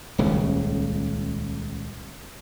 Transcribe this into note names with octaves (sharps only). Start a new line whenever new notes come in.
D#1 C#2 C#3